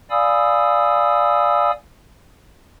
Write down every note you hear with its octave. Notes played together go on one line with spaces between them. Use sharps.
D5 F5 G#5 B5 D#6 E6